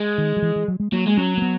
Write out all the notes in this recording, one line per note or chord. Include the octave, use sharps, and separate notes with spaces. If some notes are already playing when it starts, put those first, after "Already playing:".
Already playing: G#3
D#3
F#3
E3
E3
F#3
G#3
F#3 A#3
G#3
F#3 C#4
A#3
B3